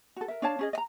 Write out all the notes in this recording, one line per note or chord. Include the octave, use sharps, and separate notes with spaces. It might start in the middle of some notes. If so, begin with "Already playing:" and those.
F#4 A4
A#4 E5
D4 C#5 F5 A5
C#4 G#4 D#5
D#5 A#5